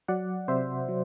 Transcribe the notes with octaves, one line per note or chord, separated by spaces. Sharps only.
F#3 D5 F#5
C3 C5 E5
F#3